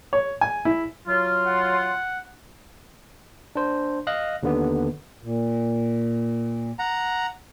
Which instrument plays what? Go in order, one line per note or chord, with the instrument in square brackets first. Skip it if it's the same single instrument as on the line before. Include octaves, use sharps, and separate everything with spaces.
[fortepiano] C#5
G#5
E4
[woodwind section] F#3 F4
[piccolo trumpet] F#5
[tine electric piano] D4 C5
D#5 F5 F#6 A#6
D#2 D3 B3
[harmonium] A#2
[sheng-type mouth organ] F#5 A#5